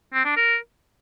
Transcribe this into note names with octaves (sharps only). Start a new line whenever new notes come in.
C4
D4
A#4